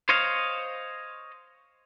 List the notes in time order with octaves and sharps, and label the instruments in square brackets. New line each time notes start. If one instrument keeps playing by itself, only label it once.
[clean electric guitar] C5 C#5 D#5 F5